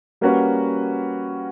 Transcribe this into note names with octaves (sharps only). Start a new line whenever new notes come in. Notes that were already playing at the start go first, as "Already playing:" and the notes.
G3 A#3 C#4 F#4 B4